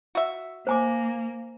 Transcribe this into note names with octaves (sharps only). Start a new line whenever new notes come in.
F#4 E5
A#3 C5 G#5 D6